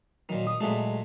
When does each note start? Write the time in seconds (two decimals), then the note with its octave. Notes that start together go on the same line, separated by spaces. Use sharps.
0.29 A#2 D#3 F#3
0.47 D#6
0.61 A#2 F#3 G#3 A3